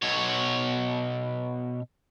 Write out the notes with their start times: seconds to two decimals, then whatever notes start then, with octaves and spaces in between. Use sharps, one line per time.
0.02 B2 C#5